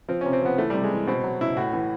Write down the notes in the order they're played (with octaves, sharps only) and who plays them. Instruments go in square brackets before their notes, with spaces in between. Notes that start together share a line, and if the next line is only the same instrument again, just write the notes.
[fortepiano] F3 C4
C3 C#4
C4
F3 B3
E3 A3
C3 G3
G#3
E3
B2 C4
F#3
B2 E4
A2 F#4
E3